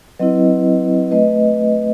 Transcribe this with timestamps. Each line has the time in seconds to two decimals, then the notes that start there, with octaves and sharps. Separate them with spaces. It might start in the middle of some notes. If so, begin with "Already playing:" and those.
0.19 F#3 C4 E4 B4 D#5
1.11 A3 B4 D#5